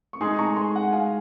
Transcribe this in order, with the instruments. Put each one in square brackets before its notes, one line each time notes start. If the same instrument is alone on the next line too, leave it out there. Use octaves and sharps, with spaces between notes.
[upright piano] C#6
[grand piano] G#3 D#4 G#4 [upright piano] G#5 C6
[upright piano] A#5 C#6
G#5 C6
F#5
F5 G#5